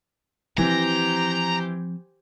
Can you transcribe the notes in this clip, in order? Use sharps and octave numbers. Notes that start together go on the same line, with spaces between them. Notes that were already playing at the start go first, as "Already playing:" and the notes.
E3 F3 C4 G4 C5 A#5